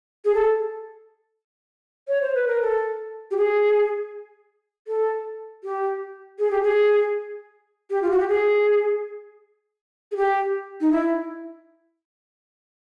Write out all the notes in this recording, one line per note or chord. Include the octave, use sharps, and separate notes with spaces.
G#4
A4
C#5
C5
B4
A#4
A4
G4
G#4
A4
G4
G#4
G4
G#4
G4
F4
F#4
G4
G#4
G#4
G4
D#4
E4